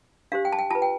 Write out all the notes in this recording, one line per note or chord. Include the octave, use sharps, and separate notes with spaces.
D4 G4 C5 F5
G5
A5
G5
F4 B4 A5
G5